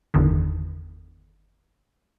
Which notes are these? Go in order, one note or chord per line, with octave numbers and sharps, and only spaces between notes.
G1 E2 D3 D#3